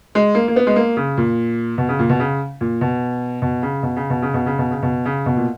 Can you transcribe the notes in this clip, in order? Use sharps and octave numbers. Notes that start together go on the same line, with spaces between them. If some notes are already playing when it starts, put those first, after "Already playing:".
G#3
A#3
A#3
B3
G#3
A#3
C#3
A#2
B2
C#3
A#2
B2
C#3
A#2
B2
B2
C#3
B2
C#3
B2
C#3
B2
C#3
B2
C#3
B2
C#3
B2
A#2